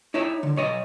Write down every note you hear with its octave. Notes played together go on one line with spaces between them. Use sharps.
D#4 E4 C#5 E5
D3
B1 C#5 D#5